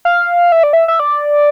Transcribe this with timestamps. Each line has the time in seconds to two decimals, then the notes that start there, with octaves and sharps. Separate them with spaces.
0.05 F5
0.52 E5
0.63 D5
0.73 E5
0.88 E5
1.00 D5